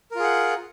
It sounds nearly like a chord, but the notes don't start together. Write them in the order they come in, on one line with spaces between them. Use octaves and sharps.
A#4 F4 G#4 F#5